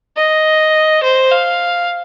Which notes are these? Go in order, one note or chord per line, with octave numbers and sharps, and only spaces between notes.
D#5
C5
F5